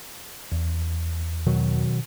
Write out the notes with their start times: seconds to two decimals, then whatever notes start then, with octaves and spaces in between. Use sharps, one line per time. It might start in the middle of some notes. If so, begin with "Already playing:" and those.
0.52 E2
1.46 B2 D#3 F#3